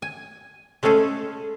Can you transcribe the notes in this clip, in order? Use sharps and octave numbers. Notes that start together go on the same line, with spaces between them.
G#5
G#3 A3 C#4 G#4 A4